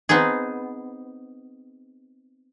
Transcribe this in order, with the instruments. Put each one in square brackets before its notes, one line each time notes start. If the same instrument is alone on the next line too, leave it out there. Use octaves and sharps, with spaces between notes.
[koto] B3 C4 D#4 G#4